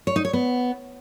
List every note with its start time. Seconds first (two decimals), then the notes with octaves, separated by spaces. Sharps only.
0.07 C#5
0.16 D#4
0.25 C#5
0.33 B3